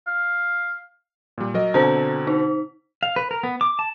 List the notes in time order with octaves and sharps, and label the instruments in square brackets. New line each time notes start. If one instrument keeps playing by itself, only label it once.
[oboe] F5
[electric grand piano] A#2 G3
F#3 A#4 D#5
[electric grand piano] B2 D3 C4 [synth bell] C5 A#5
[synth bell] D#4
[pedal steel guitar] F5
B4
A#4
B3
D6
A5